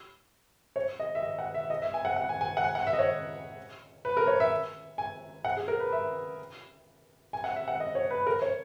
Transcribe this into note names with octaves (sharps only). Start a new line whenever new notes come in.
C#5
D#5
E5
D#5
F#5
E5
D#5
E5
G#5
F#5
F#5
G#5
G#5
F#5
G#5
F#5
E5
D#5
C#5
B4
A#4
C#5
E5
G#5
F#5
G#4
A#4
B4
E5
G#5
F#5
E5
F#5
D#5
C#5
B4
A#4
C#5